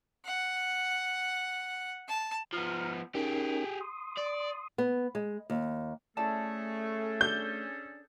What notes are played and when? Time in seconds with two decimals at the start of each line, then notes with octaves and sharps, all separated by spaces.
0.25 F#5
2.08 A5
2.53 F3 B3 A#5 F6
3.15 C#4 D#4 G4 G#4 A#4
3.81 C6 D#6
4.18 D5
4.78 B3
5.15 G#3
5.50 D#2
6.17 A3 C#4 E4 G#4 A4 D5 A5
7.21 D4 G6